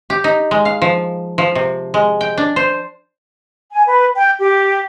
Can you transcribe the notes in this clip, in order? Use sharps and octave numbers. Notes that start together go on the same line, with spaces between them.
G4
D#4
G#3
F5
F3
F3
C3
G#3
G5
D4
C5
G#5
B4
G5
G4